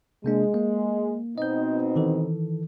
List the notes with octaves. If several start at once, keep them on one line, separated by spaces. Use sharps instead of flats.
C3 G#3 A#3 D4
A#3
B2 C4 D#4 D#5 G6
D#3 E3 A4